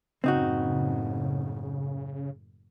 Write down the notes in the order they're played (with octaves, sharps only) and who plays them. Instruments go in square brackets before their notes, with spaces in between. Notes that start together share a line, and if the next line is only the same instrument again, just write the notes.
[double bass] F#1 A2 [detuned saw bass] C#3 [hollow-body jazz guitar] C4 D#4 F#4